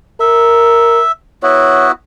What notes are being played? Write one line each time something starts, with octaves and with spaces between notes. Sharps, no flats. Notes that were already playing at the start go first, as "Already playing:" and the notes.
A#4 E5
B3 E4 F#4 C#5